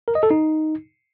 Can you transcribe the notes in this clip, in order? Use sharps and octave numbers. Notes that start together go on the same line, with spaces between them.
A#4
D#5
A4
D#4